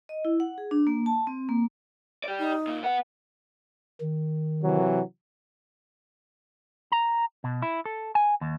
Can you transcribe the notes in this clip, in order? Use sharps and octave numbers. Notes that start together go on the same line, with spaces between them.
D#5
E4
F#5
G#4
D4
A#3
A5
C4
A#3
G4 D5
D#4
A#2
B3 F#5
D#3
C3 E3 F#3
A#5
B2
E4
A4
G#5
D#2